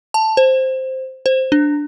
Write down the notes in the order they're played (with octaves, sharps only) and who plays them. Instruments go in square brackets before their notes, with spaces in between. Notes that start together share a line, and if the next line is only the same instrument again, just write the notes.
[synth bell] A5
C5
C5
D4